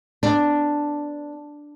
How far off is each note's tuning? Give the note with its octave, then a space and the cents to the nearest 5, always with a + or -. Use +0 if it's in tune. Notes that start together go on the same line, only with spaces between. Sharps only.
B3 +20 D4 +0